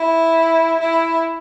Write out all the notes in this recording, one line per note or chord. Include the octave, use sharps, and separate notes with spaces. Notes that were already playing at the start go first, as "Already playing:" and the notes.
Already playing: E4
E4